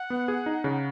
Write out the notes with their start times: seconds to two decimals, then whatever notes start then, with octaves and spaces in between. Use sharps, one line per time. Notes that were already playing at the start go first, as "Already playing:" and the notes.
Already playing: F#5
0.10 B3
0.28 G#4
0.46 D#4
0.64 C#3